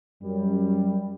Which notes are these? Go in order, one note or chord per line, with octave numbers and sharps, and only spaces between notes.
F#2 G3